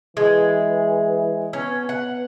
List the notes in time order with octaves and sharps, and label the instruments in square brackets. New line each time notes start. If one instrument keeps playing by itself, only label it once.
[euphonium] E3 [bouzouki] G#3
[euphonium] B3 [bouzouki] C#4
[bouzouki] F#5